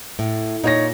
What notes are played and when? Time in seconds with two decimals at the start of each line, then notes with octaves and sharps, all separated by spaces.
0.19 A2
0.64 A#2 D#4 C#5 A#6